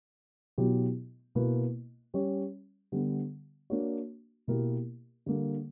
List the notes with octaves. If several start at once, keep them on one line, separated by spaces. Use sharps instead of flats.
B2 F#3 B3 E4 G4
B2 A#3 E4 B4
G3 C#4 G4 C#5
D3 G3 B3
A#3 D4 F#4 C#5
B2 A#3 E4 G4 A#4
D3 G3 A#3